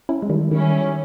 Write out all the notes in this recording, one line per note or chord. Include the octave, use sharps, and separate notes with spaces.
C#4 E4
G#3
D#3 G3
D#3 G3 C#4 E4